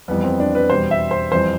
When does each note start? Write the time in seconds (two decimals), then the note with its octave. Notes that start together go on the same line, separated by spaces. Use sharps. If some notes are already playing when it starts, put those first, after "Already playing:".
0.08 F2 E3 G3 B3
0.24 C4
0.40 D4
0.55 B4
0.70 E2 B2 G3 C5
0.91 E5
1.11 C5
1.32 F2 E3 G3 C5